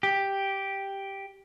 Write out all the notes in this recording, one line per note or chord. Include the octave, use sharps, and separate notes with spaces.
G4